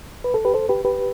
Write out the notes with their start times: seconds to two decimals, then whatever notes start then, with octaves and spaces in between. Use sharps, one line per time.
0.24 B4
0.34 A4
0.45 G4 B4
0.54 A4 C5
0.69 G4 B4
0.85 G4 B4